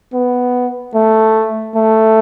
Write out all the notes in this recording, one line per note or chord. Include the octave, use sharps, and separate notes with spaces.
B3
A3
A3